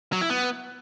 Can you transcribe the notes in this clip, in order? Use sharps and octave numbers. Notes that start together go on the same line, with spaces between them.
F#3
E4
B3